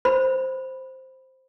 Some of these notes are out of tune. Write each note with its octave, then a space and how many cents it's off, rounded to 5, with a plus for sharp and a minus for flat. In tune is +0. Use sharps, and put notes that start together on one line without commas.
C5 +0 B5 +0